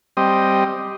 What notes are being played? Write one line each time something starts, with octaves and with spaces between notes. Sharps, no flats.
G3 C4 D#5